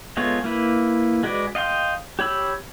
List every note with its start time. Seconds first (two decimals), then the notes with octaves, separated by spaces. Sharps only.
0.17 G#3 A3 B3 F4 C#5
0.44 A#3 E4 B4
1.23 G#3 F#4 B4 D5
1.55 D#5 F5 G5 C6
2.19 G4 C#5 B5 E6